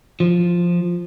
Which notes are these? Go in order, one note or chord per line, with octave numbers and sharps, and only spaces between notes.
F3